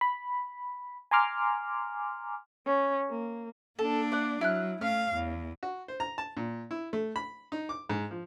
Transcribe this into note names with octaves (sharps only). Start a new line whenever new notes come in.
B5
G#5 A#5 C6 D6 F6
C#4
A#3
A#3 D4 A4
D5 F#5
F#3 E4 F6 F#6
A3 C#4 F5 F6
E2
F#4
C5
A#5
A5
A#2
E4
A3
B5
D#4
D6
G#2
F3